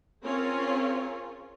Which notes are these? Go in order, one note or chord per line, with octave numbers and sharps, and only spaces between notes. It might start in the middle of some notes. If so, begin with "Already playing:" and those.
C4 C#4 F4 G#4 A#4 C#5